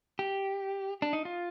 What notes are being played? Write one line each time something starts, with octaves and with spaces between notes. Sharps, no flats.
G4
D4
D#4
F4